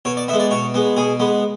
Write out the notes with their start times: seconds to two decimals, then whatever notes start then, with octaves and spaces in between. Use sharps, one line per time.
0.05 B2 C#5
0.17 D5
0.28 B3 E5
0.33 G#3
0.40 D5
0.51 B2 C#5
0.74 G#3 B3
0.97 B2 G#4
1.20 G#3 B3